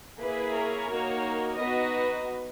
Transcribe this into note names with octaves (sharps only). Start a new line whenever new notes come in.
A#3 E4 G#4 B4
A#4 C#5
A#3 D#4 F#4
B3 D#4 F#4 B4 D#5